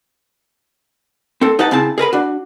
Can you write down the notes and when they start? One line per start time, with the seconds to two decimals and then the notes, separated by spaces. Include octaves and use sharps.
1.41 C4 A4
1.59 D#4 G4 B4 F#5 A5
1.71 C#3 C4 E4 A5
1.98 G#4 A#4 B4 B5
2.13 D4 F#4